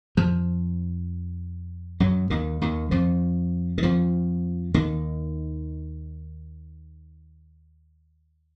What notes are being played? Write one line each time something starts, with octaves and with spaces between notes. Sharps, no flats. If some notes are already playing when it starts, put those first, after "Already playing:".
F2 F3
F#2 F#3
D#2 D#3
D#2 D#3
F2 F3
D#3
F2 F3
D#2 D#3